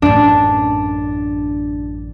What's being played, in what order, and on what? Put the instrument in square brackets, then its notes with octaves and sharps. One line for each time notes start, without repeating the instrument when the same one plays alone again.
[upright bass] A1 F#2 [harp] D4